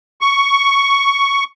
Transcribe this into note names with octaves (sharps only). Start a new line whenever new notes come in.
C#6